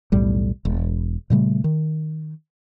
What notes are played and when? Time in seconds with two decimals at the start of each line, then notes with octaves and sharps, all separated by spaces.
0.12 B1 E2 A2 G3
0.65 E1
1.30 A#2 C#3 G3 A3
1.64 D#3